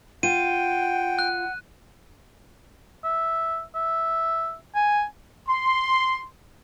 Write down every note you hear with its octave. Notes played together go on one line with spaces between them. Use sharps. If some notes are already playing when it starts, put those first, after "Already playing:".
F4 F#5 G5 D#7
F#6
E5
E5
G#5
C6